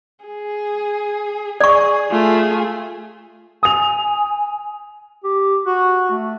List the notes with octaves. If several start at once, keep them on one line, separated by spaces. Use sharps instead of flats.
G#4
G#4 D5 C#6
A3 F4 G#4 G#5
G#5 D#6 F7
G4
F#4
A3